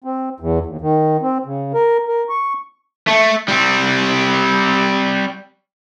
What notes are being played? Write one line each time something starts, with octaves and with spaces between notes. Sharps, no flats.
C4
E2
D#2
D#3
C4
C#3
A#4
A#4
C#6
A3
G3 C4